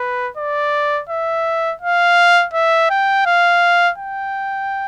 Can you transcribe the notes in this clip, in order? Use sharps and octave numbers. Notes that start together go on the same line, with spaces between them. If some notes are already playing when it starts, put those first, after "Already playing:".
Already playing: B4
D5
E5
F5
E5
G5
F5
G5